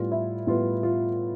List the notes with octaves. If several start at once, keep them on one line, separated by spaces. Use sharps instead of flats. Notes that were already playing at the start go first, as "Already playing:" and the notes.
Already playing: A2 G3 B3 F4
E4
A2 G3 B3 F4
F4